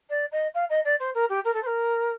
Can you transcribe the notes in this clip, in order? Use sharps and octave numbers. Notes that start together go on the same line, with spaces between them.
D5
D#5
F5
D#5
D5
C5
A#4
G4
A#4
A4
C5
A#4